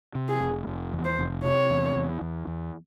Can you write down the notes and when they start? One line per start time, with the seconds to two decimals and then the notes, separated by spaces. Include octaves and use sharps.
0.15 C3
0.29 G#4
0.40 F1
0.67 F1
0.93 E2
1.05 C5
1.19 F1
1.44 C3 C#5
1.70 E2
1.96 E2
2.21 E2
2.47 E2